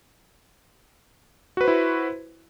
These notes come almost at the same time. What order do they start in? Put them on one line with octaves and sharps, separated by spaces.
F#4 B4 C5 E4